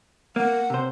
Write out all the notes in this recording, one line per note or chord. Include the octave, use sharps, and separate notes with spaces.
A#3 F#5
C3 C5